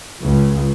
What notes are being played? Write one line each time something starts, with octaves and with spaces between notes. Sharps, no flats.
C#2